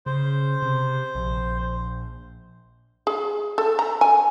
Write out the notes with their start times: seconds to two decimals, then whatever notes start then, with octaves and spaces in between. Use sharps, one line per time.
0.06 C#3 C5
0.62 C3
1.15 A#1
3.07 G#4
3.58 A4
3.79 A#5
4.01 G#5